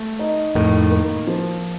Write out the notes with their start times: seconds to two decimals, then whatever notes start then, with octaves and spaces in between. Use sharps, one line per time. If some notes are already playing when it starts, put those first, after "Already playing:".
Already playing: A3
0.19 D#4
0.55 F2 A2 D#3
0.91 A#3
1.27 F3